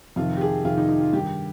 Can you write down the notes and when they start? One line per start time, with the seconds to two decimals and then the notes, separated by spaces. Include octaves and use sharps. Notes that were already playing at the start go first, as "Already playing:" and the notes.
0.16 F2 C3 D#3 F4
0.37 G4
0.41 G#4
0.65 F2 C3 D#3 F4
0.77 D#4
0.89 D#4
1.01 F4
1.13 G2 D#3 G4